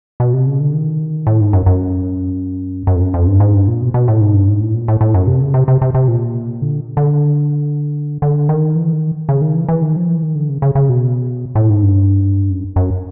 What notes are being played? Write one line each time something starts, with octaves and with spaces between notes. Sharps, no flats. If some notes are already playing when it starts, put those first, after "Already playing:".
B2
C3
C#3
D3
D#3
A2
G#2
F#2
F#2
F#2
F2
F#2
F2
G2
G#2
G2
A#2
B2
B2
A2
G#2
G2
G#2
A2
A#2
A2
A2
F#2
C3
C#3
C3
C3
C3
C3
A#2
D3
D3
D3
D#3
E3
D#3
C#3
D#3
E3
E3
D#3
F3
E3
D#3
D3
C#3
C#3
C#3
B2
A2
G#2
G2
F#2
F#2